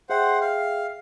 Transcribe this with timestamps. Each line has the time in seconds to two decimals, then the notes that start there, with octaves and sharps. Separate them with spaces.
0.10 G#4 C5 E5 F#5 G5
0.41 F5